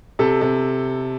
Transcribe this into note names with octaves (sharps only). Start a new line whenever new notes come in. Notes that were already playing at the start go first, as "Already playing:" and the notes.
C3 A4
C3